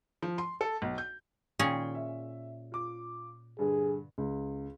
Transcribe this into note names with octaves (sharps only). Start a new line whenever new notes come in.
F3
C6
A4
B1
G6
A#2 D#3 C#4 G#4 G5
E5
F4 D6
G2 D3 G#4
C#2